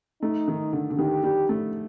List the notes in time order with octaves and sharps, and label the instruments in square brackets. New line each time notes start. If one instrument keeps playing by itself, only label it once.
[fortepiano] A3 [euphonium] D#4
[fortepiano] D#3
D3
D3
[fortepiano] D#3 [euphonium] G4
[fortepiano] G3
A3